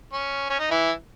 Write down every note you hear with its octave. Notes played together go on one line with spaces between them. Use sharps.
C#4
C#4
D#4
E3 E4